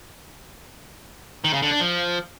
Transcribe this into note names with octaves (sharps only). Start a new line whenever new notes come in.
D#3
C#3
D3
D4
F3